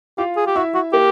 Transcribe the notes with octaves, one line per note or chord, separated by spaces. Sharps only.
F4 G4 F5
G#4
G4
E4 F#4 E5
F#4
A#3 G4 A#4